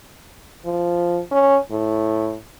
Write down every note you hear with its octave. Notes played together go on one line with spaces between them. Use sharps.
F3
C#4
A2